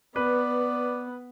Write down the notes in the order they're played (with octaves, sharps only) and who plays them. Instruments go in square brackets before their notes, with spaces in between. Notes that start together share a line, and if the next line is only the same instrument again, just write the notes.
[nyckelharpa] B3 [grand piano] B4 [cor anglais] D5